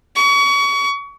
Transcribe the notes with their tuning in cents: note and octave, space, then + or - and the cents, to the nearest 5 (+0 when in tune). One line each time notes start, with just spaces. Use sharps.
C#6 +30